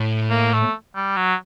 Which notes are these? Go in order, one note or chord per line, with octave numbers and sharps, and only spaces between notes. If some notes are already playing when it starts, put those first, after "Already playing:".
Already playing: A2
A#3
A3
G3
F#3